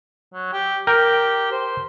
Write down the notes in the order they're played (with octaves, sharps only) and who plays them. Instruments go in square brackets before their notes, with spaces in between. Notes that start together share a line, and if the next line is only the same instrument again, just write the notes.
[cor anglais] F#3
G4
[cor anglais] G4 [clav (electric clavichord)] A#4 G5
[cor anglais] C5